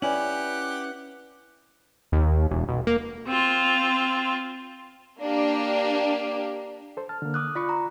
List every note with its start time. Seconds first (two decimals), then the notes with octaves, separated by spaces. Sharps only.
0.02 C#4 E4 G4 B4 D5 F#5 G#5 F#7
2.12 D#2
2.51 E1
2.69 B1
2.87 A#3
3.27 C4 F4
5.20 A#3 D4 G4
6.97 A4 C5
7.09 A5 F6
7.22 D3 A#3
7.34 D6 D#6 F#6
7.55 F4 D5 B5 C#6
7.69 A#5